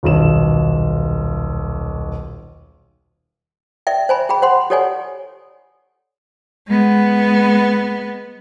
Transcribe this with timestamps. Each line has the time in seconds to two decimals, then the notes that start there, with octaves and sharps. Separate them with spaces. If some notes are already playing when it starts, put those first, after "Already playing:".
0.03 D#1 B1 E7
3.87 D5 E5 G5
4.09 C5 G#5 B5
4.29 G#4 G5 B5
4.42 C5 F#5 C6
4.70 G4 A4 C#5 D5 F#5 G#5
6.68 G#3 B3